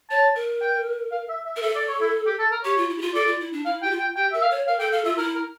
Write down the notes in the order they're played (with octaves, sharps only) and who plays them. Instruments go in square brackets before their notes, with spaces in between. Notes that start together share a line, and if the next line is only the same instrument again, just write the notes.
[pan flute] C#5 [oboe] A5
[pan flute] A#4
[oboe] G5
F5
E5
E5
[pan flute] A#4
[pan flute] A4 [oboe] E5
[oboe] D5
C#5
E4
G4
A4
A#4
[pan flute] G4 [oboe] C#5
[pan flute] F4
E4
G4
F4
[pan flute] A4 [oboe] D5
[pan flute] F4
E4
D4
[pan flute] E4 [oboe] F5
[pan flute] G4 [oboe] G5
[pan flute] F4
[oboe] G5
[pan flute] G4 [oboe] G5
[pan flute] A#4 [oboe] E5
[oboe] F5
[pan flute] C#5
[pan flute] A#4 [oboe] F5
[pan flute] A4 [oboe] G5
[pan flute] A4 [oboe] F5
[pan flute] F4 [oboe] E5
[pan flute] E4 [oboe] A#4
[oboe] A#4